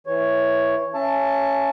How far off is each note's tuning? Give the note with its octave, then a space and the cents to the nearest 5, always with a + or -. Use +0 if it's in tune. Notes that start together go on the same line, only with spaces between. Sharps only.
E3 +0 C#5 +0
C#4 +0 E5 +25 A5 +10